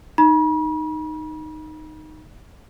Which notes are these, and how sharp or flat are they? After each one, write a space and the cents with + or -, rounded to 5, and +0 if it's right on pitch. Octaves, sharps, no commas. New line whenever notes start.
D#4 -10 B5 -45